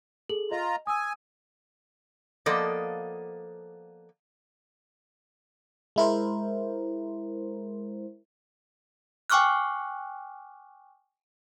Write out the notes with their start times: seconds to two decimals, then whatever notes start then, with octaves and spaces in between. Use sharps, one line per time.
0.29 G#4 A4 F#7
0.51 F4 D#5 A#5
0.87 G#5 D#6 E6
2.46 F3 A#3 B3 A4 D5 D#5
5.96 G#3 E4 A#4 C5
9.30 G5 G#5 C#6 D6 F6 F#6